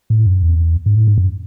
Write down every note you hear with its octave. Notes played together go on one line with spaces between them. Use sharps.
A2
F#2
E2
G#2
A2
G#2
F#2